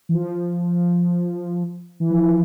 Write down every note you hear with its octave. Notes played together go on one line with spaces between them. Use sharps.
E3
F3
E3
F3
E3